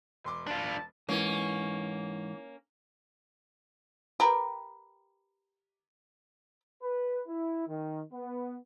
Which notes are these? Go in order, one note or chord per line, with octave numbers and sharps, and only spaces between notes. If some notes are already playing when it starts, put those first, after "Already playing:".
E1 C6 D6
D4 F4 A5
G#2 E3 A#3 C#4
G4 A#4 B4
B4
E4
D#3
B3